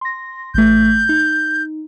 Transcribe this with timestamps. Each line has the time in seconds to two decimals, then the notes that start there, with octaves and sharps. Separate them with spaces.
0.01 C6 A#6
0.54 A1 A3 G6
1.09 D#4